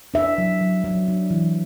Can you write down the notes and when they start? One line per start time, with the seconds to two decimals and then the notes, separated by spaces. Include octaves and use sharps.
0.14 D4 E5
0.38 F#3
0.61 F#3
0.84 F#3
1.08 D4
1.30 E3